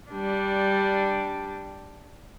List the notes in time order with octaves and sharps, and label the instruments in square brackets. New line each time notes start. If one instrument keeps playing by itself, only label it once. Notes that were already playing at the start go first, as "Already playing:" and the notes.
[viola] G3 D4